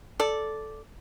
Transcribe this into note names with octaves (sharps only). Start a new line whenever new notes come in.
A4 D5